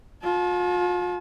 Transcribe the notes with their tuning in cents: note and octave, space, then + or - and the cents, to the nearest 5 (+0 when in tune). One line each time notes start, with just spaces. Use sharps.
F4 +40 A5 -35